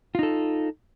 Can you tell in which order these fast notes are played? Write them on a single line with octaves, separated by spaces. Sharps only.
F4 D#4 A4